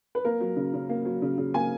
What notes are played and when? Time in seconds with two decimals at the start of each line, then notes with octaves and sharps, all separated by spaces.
0.15 B4
0.25 A#3 A#4
0.40 F#3
0.56 C#3
0.74 C#3
0.89 A#3
1.05 F#3
1.22 C#3
1.38 C#3
1.54 A#3 G#5